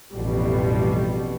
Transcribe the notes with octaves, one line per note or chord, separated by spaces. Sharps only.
A1 F2 B2 G3